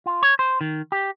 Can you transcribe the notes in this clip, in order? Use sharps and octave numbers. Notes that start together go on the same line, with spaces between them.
F4
C#5
C5
D#3
G4